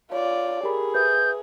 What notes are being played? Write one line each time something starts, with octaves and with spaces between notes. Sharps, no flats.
F4 C#5 D5
G4 G#4 A#4 B5
B4 E5 D#6 G6